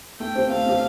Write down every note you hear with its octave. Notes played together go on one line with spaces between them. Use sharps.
A3 G5
C4 G4 C5
A3 F5
C4 G4 C5